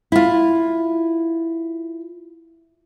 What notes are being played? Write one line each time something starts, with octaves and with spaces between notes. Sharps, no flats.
E4 F4